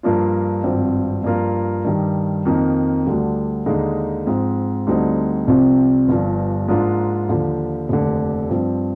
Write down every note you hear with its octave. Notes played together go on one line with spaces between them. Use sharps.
G2 F3 A#3 D4 F4
G#1 G2 F3 C4
G2 F3 A#3 F4
G2 D#3 G3
F2 D#3 A#3 D#4
D2 D3 G3
D#2 D3 G#3 D#4
G#2 F3 C4
D2 D3 G3 C4 D#4
C2 C3 F3 C4
G1 G2 F3
G#2 F3 A#3 D4 F4
D#2 D3 F3
F1 D#2 D3
G2 F3 C4